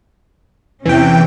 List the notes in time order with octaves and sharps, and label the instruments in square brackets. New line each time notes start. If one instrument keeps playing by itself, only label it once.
[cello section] E2 C3 C#4 [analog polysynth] E3 G5